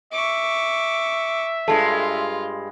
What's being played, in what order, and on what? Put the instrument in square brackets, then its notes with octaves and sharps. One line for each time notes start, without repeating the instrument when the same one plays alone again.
[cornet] E5 [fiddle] C#6 D6
[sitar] G2 G#3 [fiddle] F4 [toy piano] A4 A5